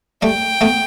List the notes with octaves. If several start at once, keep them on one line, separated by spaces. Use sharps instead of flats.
G3 A3 G5
A3 B3